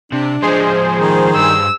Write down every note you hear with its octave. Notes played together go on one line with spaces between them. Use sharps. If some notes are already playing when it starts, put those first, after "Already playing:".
C3 D4
F3 G#3 G#4 C5
D#3
G2 E6